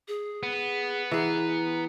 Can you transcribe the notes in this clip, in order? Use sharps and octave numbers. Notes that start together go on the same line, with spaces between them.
G#4
B3
E3 G#4 A#5